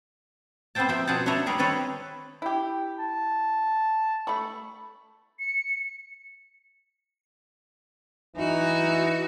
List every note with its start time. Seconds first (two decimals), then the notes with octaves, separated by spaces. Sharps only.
0.75 B3 C4 A4 C5 G5 A5
0.89 F3 A#3 C5 E5 G5
1.07 B2 F4 G#4 D5 F#5 A5
1.26 D4 A4 B4 C#5 E5 A#5
1.46 G3 G#4 A#4 B4 C#5
1.58 D#3 C4 D4 A4 B4 C#5
2.42 E4 G4
2.98 A5
4.27 A3 B5 C#6
5.39 C#7
8.37 E3 D#4 F#4